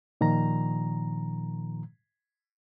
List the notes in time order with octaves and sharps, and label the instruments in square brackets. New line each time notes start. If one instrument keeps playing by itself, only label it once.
[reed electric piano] A#2 D#3 F3 A#5